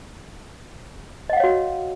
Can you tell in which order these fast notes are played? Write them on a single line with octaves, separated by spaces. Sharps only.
D#5 F#5 F5 C#5 F#4